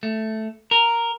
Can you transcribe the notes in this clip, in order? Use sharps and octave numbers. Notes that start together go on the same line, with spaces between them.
A3
A#4